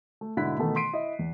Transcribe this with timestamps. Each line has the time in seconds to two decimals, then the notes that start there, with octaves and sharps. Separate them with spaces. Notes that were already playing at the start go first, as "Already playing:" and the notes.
0.21 A3
0.37 G#2 B2 D3 E4 F#6 B6
0.59 B2 D#3 E3 A3 B3 A4
0.76 C6 B6 C7 D7 D#7
0.93 E4 D#5 E5
1.19 E2